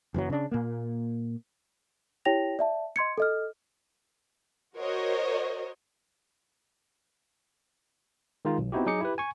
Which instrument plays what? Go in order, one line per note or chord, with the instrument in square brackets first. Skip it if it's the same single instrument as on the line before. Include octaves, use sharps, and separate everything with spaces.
[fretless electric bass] F#1 F#2 E3 F#3
C#3 D4
A#2 A#3
[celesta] E4 G4 C#5 G5 A#6 F7
D5 E5 A5
D#5 C6 G#6 C#7
A4 D#5 F6
[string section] F#4 A#4 C5 C#5 D#5
[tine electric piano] D#3 G#3 D#4 F4
B1
B3 C4 D#4 E4 F#4 G4
F#3 D#4 G#4 D6 C#7
E4 G4 B4
G#5 C#6